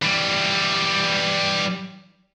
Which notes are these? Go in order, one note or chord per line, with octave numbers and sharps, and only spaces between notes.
E3 G3